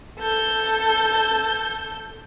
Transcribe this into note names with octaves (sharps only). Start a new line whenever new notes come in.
A4 G6